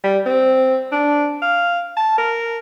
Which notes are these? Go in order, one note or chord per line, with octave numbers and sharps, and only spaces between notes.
G3
C4
D4
F5
A5
A#4